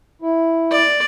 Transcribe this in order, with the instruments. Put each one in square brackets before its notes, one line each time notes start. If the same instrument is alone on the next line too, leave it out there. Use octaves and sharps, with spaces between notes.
[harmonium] E4
[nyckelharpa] D5